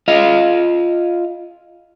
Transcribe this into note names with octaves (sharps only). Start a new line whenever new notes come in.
F4 D#5 F5